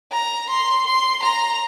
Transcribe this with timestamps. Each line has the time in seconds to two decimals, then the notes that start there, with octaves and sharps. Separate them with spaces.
0.12 A#5
0.50 C6
0.87 C6
1.23 A#5